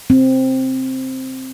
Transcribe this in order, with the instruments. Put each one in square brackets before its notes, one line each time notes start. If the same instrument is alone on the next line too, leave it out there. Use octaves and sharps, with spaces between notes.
[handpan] C4